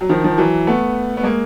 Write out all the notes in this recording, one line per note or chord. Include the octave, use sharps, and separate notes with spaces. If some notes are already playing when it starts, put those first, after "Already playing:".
F#3
D#3 F3
D#3 F3
E3 F#3
A3 B3
B3
G#3 A#3